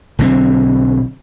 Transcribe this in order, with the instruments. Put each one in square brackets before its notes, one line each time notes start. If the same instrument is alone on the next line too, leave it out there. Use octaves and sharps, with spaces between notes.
[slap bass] B1 D3 F3 C4